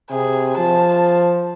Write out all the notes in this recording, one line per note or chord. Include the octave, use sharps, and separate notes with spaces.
C3 G#4
F3 A5